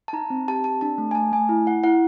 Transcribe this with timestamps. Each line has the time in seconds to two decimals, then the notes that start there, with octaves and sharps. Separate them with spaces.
0.08 A5
0.13 D#4 A#5
0.30 C4
0.48 G4 A5
0.64 C4 A5
0.81 D4 A5
0.98 A3
1.11 G#5
1.15 A3 A5
1.32 A3 G#5
1.49 E4
1.66 E4 F#5
1.84 E4 F#5